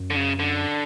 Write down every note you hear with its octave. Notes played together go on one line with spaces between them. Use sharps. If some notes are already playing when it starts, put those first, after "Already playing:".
Already playing: F#2
D3
C#3
D3